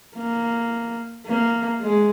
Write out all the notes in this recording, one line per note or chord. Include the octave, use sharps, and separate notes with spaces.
A#3
A#3
G#3